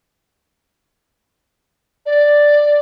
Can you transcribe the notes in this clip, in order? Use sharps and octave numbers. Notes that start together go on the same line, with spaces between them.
D5